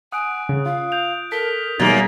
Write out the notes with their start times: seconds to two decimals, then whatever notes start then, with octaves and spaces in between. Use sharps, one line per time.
0.12 F#5 G#5 D#6 F#6 D7
0.49 C#3
0.66 F4 F5
0.92 G6 F7
1.32 A4 A#4 B6 G7
1.79 F#2 B2 G3 A#3 D#4 G#4 A6